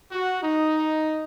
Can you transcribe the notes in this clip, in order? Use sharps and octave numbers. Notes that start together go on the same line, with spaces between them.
F#4
D#4